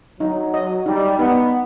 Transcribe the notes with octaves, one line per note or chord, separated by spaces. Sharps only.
F#3 D#4
D#5
G3 D#4
B3 D#4